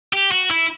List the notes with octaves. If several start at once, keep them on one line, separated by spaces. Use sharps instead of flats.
G4
F#4
E4